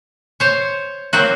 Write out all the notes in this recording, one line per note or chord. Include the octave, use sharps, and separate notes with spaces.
C5 C#5
F#3 A#3 C4 F#4